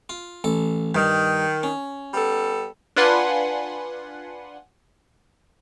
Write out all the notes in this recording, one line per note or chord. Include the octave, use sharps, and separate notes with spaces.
F4
A1 A4
G2 D#3
C#4
G3 B3 A4
D4 F4 B4 F#5 G#5 C6